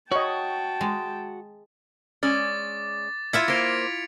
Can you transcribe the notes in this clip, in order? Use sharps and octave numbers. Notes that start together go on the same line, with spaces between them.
F#4 C#5 D#5 G5 A5
G#3
G#3 C#4 D5 D6 A6
E4 F4 E5 G#6 B6 C#7
A#3 C5 A#6 D7 F7